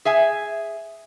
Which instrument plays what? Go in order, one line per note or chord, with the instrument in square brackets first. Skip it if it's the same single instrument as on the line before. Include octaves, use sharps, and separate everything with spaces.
[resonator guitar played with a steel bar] G#4 E5 G#5